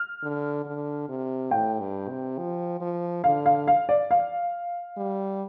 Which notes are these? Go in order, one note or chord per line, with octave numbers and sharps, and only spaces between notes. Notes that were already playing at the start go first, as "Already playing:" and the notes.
Already playing: F6
D3
D3
C3
A2 G5
G2
C3
F3
F3
D3 F5
F5
F5
D5
F5
G3